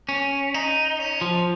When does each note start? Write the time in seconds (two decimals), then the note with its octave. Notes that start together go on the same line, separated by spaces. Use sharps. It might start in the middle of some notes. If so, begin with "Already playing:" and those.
0.09 C#4
0.54 D#4
0.99 C#4
1.21 F3